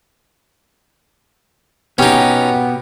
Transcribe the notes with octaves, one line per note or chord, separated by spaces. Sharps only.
B2 B3 C#4 D#4 G4